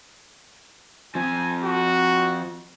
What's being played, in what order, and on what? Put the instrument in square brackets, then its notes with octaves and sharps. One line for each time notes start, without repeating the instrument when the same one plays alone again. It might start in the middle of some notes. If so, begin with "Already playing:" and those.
[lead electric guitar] F3 C4 [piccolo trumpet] G#5
[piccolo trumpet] F#4